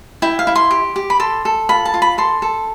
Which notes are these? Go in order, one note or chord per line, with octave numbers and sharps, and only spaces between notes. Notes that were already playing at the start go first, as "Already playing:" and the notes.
E4 G5
F5
E4
C6
G4
G4
B5
A4 C6
A4
F4 B5
A5
F4
B5
A4 C6
A4